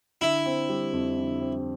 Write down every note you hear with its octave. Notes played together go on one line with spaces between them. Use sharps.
D3 E4
C4
G3
F2
D3
C4